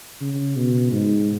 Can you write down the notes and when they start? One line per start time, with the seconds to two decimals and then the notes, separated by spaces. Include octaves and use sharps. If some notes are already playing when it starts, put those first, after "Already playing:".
0.21 C#3
0.57 B2
0.92 G#2